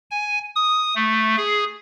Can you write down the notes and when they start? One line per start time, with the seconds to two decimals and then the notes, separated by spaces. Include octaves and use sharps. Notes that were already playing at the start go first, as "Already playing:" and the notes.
0.11 G#5
0.56 D#6
0.96 A3
1.37 G#4